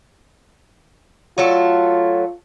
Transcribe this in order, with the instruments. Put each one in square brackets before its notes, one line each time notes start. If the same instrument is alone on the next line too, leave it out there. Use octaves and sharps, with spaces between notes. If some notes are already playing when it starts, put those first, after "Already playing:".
[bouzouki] F#3 A3 A4 [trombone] F4